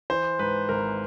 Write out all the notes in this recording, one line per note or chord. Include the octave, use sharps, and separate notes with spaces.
E3 C5
G#2 B4
G#1 A#4